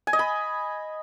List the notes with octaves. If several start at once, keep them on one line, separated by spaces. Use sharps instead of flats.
G#5
D#5
B5